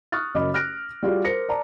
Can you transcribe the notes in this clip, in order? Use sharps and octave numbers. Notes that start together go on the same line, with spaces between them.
C#6 D#6 F6 F#6 A6
F#1 F#2 D#5 B5 D6
F6 F#6 A#6 D7
G3 F4 F#4 G#4 D5
A#4 C5 A#6 C#7
D5 A5 A#5